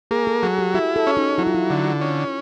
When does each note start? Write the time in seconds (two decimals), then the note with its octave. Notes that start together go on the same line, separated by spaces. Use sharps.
0.11 A#3 G#4
0.27 A4
0.43 F#3 G#4
0.59 G4
0.74 E4 F#4
0.96 A4
1.07 C#4
1.17 D#4
1.38 F#3 E4
1.47 F4
1.55 E4
1.70 D3
2.01 C#4